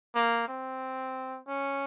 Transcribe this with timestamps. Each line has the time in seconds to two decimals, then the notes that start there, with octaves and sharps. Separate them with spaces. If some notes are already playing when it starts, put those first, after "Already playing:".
0.15 A#3
0.48 C4
1.48 C#4